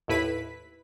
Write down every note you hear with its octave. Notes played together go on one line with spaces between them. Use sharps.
D#2 A2 E4 B4 B5 B6